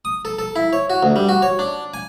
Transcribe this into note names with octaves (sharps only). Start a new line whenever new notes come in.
D#6
A4
A4
E4
C#5
F#4
D2
G3
F#4
C#5
D4
G#5